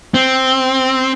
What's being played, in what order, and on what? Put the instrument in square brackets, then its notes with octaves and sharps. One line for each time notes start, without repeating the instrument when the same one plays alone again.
[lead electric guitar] C4